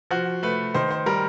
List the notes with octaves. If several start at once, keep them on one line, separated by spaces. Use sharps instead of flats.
F3 F#4
A3 B4
D#3 C5
C5
G3 A#4